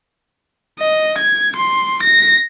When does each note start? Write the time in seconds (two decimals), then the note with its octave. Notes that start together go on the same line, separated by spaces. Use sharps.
0.80 D#5
1.18 G#6
1.57 C6
2.03 A#6